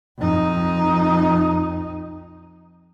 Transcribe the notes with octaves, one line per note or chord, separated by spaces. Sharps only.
F2 D#4